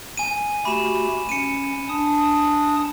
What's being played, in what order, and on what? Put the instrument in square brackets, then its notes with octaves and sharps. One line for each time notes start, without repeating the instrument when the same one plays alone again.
[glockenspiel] G#5 D#7
[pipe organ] A3 F#4 G4 [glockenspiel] B5 E7
[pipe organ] C#4 [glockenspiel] C#7 D#7
[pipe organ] D4 A5 D#6